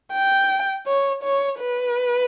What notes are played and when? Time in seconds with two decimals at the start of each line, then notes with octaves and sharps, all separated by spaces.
0.12 G5
0.86 C#5
1.23 C#5
1.59 B4